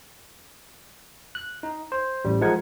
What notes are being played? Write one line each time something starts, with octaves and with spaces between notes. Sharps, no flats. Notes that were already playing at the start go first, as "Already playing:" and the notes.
F#6
D#4
C5
A1 G3
F3 G#3 D#4 A#4 F#5 G#6